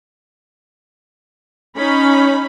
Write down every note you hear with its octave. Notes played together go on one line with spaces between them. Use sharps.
C#4 D#4 B5